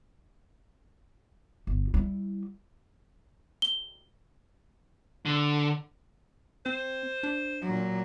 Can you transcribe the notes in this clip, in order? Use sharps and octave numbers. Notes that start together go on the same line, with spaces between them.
G1
G3 E4
G7
D3
C4 C5
D4
A#2 F#3